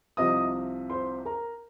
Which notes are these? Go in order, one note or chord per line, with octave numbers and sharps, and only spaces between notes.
C2 C3 F3 D#5 D#6
C5 C6
A#4 A#5